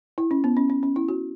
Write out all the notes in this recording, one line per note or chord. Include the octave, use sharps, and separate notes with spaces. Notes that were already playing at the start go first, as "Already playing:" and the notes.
E4
C#4
B3
C#4
C#4
C#4
E4
F#4